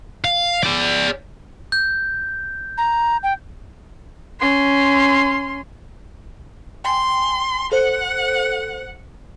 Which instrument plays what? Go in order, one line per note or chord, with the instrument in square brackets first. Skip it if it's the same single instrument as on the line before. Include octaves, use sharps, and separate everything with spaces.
[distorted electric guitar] F5
G#4 D5
[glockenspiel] G6
[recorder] A#5
G5
[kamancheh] C#4 C6
[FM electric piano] G5 G#5 [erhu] C6
[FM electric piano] A4 C5 [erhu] F#5